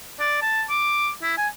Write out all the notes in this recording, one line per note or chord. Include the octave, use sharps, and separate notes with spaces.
D5
A5
D6
E4
G#5